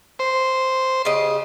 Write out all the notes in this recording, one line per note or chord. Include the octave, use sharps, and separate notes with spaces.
C5
C#3 G4 D#5